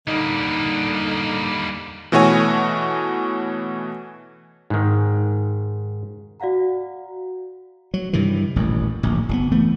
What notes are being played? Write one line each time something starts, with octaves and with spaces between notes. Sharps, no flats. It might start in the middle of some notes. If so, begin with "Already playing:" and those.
D3 G3 A#3 D#4
B2 E3 A3 F#4 C#5 G#5
G#2 D#3
F#4 D5 F5 F#5 A#5
F#3
G2 C3 D#3 E3
D#1 A1 F#2
D1 A#1
F#1 B2 B3
E3 A3 B3